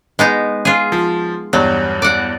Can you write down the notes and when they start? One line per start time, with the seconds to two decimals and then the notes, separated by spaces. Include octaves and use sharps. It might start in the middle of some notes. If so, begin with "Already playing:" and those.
0.19 G#3 B3 D#4
0.65 F4 G#4
0.92 F3
1.53 E2 G2 F#3
2.02 D5 F#5